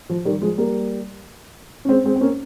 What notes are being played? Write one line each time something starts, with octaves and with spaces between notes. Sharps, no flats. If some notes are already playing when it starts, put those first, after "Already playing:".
F3
D#3 G3
F3 G#3
G3 A#3
C#4
G#3 C4
G#3 C4
C4
A#3 C#4